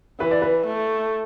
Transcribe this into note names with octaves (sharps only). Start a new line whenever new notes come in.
E3 B4
D5
B4
A3